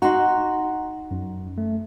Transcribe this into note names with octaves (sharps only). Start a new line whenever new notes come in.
D#4 F#4 A#5 C6
F#2
A3